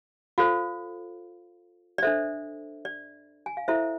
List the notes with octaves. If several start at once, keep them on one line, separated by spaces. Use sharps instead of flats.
F4 A4 C5 F5
D5
D4 A4 C5 E5
D5
G#5
F5
E4 A4 C5 E5